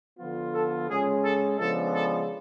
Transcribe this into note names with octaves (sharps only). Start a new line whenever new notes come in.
D3 F3 B3 F4
A4
C#3 G#3 C#4 G#4
A4
C#3 F3 G#3 B3 D4 A4
A4